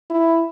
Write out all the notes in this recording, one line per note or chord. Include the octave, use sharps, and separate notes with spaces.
E4